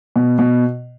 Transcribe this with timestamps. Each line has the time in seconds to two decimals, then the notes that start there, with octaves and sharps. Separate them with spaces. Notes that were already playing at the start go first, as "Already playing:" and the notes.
0.16 B2
0.39 B2